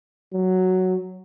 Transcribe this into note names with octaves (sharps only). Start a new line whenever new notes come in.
F#3